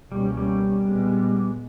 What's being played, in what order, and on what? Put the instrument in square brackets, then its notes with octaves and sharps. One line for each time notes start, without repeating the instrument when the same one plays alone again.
[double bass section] C#2 B2 A#3 C#4 [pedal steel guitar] G3
[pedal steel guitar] G3
[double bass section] A#2 G#3 B3